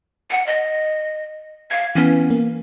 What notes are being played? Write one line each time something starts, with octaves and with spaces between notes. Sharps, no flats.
F#5
D#5
F5 G#6
E3 B3 C#4
A#3